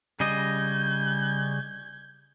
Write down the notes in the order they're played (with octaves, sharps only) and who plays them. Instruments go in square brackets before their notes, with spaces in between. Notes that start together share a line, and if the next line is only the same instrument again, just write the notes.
[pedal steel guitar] C#3 G3 D#5 [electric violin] G6 G#6